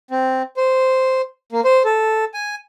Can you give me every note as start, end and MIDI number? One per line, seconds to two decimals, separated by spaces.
0.11 0.42 60
0.57 1.22 72
1.52 1.61 58
1.64 1.83 72
1.85 2.25 69
2.34 2.55 80